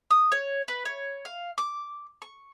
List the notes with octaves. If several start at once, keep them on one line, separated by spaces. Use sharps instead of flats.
D#6
C#5
B4
C#5
F5
D6
C#6